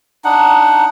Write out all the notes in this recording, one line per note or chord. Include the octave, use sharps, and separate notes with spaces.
D4 D#4 F#5